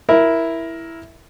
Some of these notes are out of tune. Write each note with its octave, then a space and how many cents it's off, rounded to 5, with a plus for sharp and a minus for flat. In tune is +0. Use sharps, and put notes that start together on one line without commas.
E4 +0 A#4 +10